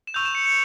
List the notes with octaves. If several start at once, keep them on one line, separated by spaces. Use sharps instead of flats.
E7
C#6 E6 G6 F7
E7
C#7
C#7